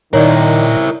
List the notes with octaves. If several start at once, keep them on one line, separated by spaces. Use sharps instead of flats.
A#2 D#3 E4 A#4 C#5 D5